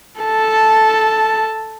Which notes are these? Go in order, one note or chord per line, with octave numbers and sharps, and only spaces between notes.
A4 A5